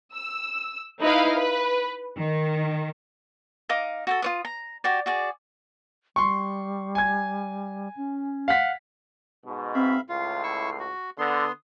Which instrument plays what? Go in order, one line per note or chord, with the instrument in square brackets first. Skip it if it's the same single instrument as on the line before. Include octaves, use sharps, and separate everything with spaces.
[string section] E6
D#4 E4 B4 D#5 F5
B4
D#3
[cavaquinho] D#4 D#5 F5 D6
F#4 G4 A4
F4 C#5 D#6
A#5
F#4 G4 D5
F#4 G#4 D5
[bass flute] G3 [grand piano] C6 C#6
[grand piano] G#5 G#6
[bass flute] C#4
[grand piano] F5 F#5 B6
[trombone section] G#2 B2
[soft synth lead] C4 [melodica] E5 F5 B5
[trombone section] C#2 A2 [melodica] F4 [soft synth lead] C7
[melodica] E4 C#6 E6
F#4
[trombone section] D3 [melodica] B3 C6 [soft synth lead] D#6